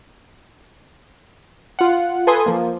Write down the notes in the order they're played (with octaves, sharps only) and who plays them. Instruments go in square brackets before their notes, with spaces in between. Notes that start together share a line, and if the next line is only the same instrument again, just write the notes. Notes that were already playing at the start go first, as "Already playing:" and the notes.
[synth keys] F4 F#5
A4 B4 G#5 C6 D#6 G#6
F3 A#3